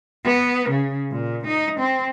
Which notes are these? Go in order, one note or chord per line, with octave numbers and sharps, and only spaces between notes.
B3
C#3
A#2
D#4
C4